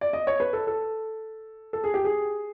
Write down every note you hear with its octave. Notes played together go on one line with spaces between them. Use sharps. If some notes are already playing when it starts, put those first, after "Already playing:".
D5
D#5
C#5
B4
A4
A4
A4
G#4
G4
G#4